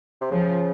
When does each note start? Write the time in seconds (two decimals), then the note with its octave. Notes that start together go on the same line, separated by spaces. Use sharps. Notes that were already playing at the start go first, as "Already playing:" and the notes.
0.21 C3
0.31 C#3 F3